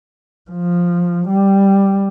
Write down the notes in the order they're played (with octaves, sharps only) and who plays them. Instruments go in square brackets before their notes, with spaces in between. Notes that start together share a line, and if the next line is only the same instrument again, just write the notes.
[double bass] F3
G3